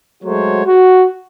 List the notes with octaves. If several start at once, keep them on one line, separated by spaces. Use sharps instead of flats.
F#3 G#3 A3 F#4 C5 C#5
F#4